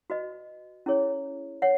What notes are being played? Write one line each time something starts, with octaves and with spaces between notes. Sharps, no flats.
F#4 B4 D#5
C#4 E4 G#4 C#5
C#5 F#5